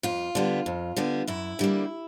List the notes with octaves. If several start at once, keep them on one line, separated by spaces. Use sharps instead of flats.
F2 F4
D3 G3 B3
F2
D3 G3 B3
F#2 E4
D3 G3 A#3